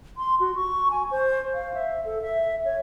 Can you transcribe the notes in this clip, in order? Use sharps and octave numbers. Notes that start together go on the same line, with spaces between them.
C6
F#4
C#6
G#5
C5
F5
E5
A4
E5
C#5